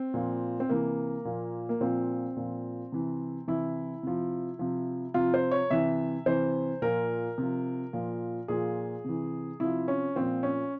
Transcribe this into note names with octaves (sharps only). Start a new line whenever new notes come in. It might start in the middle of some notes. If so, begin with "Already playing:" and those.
Already playing: C4
A#2 F3
C4
C3 E3 A#3
A#2 F3
A#3
A#2 F3 C4
A#2 F3
C3 E3
C3 E3 E4
C3 F3
C3 F3
C3 F3 F4
C5
C#5
C3 E3 E5
C3 E3 C5
A#2 F3 A#4
C3 F3
A#2 F3
A#2 F3 G#4
C3 E3
C3 F3 E4
C#4
A#2 F3 C4
C#4